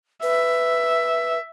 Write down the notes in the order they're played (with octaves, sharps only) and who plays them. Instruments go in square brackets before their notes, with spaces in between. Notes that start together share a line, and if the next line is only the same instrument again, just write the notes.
[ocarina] B4 [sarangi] E5